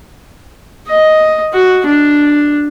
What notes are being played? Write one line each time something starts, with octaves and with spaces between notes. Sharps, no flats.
D#5
F#4
D4